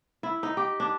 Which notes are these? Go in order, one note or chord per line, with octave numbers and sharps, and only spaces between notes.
E4
D#4
G4
D4